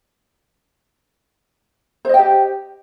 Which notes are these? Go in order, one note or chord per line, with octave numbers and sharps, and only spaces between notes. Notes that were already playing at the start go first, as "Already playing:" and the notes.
G4 C5 D#5 G5